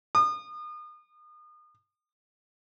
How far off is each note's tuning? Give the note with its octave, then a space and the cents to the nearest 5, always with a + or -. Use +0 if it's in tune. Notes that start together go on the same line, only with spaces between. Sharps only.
D#6 -35